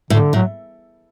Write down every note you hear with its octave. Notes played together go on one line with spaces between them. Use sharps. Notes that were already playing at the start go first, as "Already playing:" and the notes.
A2 D3
A2 F#3